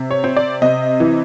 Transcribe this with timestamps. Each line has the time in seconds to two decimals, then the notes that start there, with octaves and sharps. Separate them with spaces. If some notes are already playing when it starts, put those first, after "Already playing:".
Already playing: C3
0.11 C#5
0.24 C4
0.37 D5
0.62 C3 D#5
1.00 E3